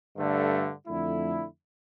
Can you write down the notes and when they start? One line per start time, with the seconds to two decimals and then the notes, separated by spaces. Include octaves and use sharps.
0.16 G2 D3 A3
0.87 F2 D3 A3 E4